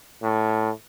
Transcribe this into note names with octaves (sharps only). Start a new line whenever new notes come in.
A2